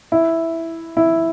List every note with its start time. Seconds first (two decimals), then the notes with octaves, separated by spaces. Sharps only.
0.12 E4
0.97 E4